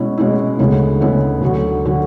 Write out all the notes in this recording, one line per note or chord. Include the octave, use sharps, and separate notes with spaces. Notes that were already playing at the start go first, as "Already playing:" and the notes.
Already playing: B2 G#3 C#4 E4
B2 G#3 C#4 E4
D2 C#3 G#3 B3 E4
D2 C#3 G#3 B3 E4
D2 D3 F#3
D3 F#3